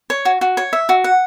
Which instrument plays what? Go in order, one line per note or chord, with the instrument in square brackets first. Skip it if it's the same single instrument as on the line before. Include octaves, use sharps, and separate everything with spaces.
[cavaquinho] C#5
F#4
F#4
C#5
E5
F#4
F#5